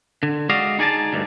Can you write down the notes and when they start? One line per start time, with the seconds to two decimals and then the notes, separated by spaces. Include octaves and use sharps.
0.23 D3
0.49 G#3 F#4 D5 D#5 F5
0.79 D#4 G#4 D5 G#5 A5
1.13 D2 G2